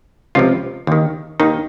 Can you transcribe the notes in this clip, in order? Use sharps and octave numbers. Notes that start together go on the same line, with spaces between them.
C#2 C3 F3 F4
D#2 D#3
D#2 D#3 D#4